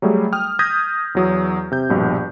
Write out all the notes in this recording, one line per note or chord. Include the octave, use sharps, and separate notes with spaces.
F#3 G3 A3 G#4
G5 D#6 F6
D#6 G6 G#6 A#6 B6
E2 F#3 D#6
C3 G6
A#1 G2 B2